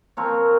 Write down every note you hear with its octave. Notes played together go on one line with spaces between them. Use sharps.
F3 C4 A#4 C#5